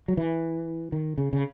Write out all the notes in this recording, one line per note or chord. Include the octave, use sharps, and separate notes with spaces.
F#3
E3
D#3
C#3
C#3